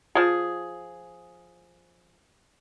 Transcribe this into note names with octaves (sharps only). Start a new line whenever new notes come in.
F3 G#4